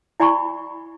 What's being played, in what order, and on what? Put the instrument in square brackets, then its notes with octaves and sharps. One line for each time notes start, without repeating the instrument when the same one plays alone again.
[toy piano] E4 D5 G#5 B5 C#6